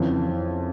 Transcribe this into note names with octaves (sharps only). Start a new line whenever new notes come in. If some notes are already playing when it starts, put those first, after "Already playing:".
Already playing: F2 C#3 E3